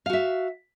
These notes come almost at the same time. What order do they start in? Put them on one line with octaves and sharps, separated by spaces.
F5 F#4 E5